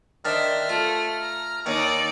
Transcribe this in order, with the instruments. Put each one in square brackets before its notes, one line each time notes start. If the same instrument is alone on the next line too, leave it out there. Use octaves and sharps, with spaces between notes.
[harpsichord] D#3 D4 [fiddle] C5 E5 [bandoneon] F6
[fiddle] A3 [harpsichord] F4
[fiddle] A#5
[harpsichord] D#2 C#5 [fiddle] D#4 D5